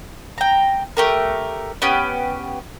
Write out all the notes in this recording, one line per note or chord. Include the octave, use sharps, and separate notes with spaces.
G5 A#5
A3 G4 A#4
B3 C#4 G4